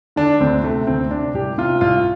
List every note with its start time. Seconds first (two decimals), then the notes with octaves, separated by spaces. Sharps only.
0.16 D3 D4
0.40 D2 C4
0.64 C3 A3
0.87 D2 C4
1.11 C3 D4
1.34 C2 G4
1.58 C3 F4
1.81 C2 F4